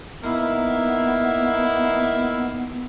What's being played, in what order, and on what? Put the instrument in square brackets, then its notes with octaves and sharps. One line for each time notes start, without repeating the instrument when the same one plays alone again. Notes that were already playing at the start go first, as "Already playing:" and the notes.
[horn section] A#3 D#4 E4 [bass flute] B3